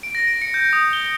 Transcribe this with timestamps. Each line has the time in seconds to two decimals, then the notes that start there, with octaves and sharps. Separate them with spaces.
0.03 D7
0.15 A#6
0.27 D7
0.42 C#7
0.54 G6
0.73 D#6
0.93 G7